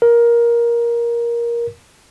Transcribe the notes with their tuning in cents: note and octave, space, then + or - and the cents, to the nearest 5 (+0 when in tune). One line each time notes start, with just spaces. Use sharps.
A#4 +15